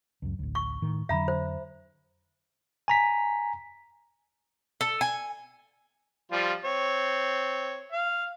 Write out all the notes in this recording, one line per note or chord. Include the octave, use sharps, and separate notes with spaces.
C#2 F#2
A1 D2
C#6
A2 D#3
F2 D3 F#3 E5 A#5 B5
C5
G#5 A#5 B6
A4
G#5
F3 G3 F4
C4 C#5
F5